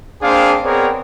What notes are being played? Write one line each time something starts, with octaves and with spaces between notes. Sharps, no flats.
A#3 C4 D4 G#4 C5 F5
B3 C4 G#4 A#4 C#5 D5